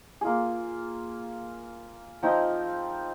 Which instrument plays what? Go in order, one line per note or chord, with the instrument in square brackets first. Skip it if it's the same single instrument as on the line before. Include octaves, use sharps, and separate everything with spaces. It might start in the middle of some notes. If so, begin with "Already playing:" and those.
[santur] A#3 F4 G#4
F3 C4 D#4